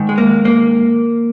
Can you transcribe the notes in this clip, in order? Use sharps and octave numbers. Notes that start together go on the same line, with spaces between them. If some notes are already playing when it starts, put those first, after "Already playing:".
Already playing: G#2 D#3
G#3
A#3
A#3